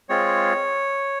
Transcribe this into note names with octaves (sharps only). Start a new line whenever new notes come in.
G#3 C4 F4 C#5